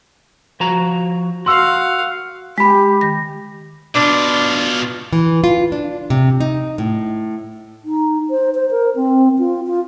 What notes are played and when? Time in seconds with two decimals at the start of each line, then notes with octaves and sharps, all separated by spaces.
0.60 F3 F#4 A#5
1.46 F#4 F5 F#5 C6 E6
2.58 G#3 G4 B5 B6
3.01 D#3 A#6
3.95 B2 D4 F4
5.13 E3
5.44 F4
5.72 D4
6.10 C3
6.40 D#4
6.78 A2
7.84 D#4
8.30 C5
8.55 C5
8.71 A#4
8.96 C4
9.39 F4
9.67 F4